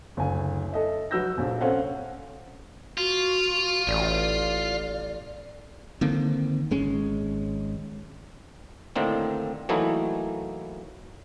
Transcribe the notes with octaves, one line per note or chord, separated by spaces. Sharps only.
F#1 D2 G#5
A4 D#5 E5
F#3 F#4 B4 E6 G6 A#6
F1 A#1 F3 D4
C4 C#4 A4 C5 F5 F#5
F4 F#4
A1 D5
D3 D#3 A#3 C4
G#1 G#3 C#4
A2 D3 D#3 A#3 C4
E3 F#3 A3 A#3 D#4 E4